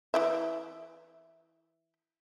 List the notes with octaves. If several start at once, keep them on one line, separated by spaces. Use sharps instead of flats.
E3 E4 E5